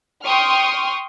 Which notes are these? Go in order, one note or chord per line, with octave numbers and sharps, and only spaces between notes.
G5 C6 C#6 D#6 F6